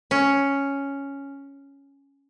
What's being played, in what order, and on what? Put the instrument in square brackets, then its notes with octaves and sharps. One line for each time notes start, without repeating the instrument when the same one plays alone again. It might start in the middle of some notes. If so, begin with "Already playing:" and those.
[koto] C#4